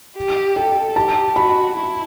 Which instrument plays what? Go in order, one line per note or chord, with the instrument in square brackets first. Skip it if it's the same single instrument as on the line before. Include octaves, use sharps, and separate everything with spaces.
[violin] G4
[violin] A4 [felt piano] G5
[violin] G4 [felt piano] A5
[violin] F#4 [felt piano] B5
[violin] E4